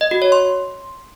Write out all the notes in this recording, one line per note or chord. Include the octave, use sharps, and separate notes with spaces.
D#5
F#4
C#5
C6